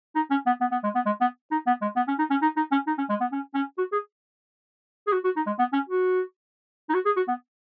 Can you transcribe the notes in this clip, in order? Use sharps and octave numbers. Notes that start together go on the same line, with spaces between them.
D#4
C#4
B3
B3
B3
G#3
B3
G#3
B3
D#4
B3
G#3
B3
C#4
D#4
C#4
D#4
D#4
C#4
D#4
C#4
G#3
B3
C#4
C#4
F#4
G#4
G#4
F#4
F#4
D#4
G#3
B3
C#4
F#4
D#4
F#4
G#4
F#4
B3